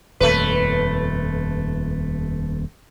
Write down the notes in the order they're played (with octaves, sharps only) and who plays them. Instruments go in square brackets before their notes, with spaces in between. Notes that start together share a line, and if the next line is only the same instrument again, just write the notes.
[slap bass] D#1 F2 [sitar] A3 B4